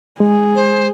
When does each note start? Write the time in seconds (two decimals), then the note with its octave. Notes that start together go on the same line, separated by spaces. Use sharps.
0.20 G#3 G#4
0.55 C5